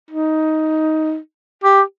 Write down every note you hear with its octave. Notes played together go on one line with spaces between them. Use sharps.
D#4
G4